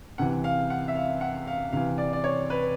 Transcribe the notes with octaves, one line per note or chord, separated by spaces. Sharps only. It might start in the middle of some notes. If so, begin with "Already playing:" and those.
C3 E3 F#5
F5
F#5
E5
F5
F#5
F5
C3 E3 F5
D5
D5
C#5
B4